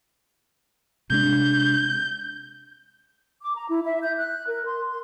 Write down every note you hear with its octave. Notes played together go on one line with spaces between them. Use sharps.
C3 G#3 D4 G6
D6
A#5
E4
E5
G6
F#6
A#4
C6
C6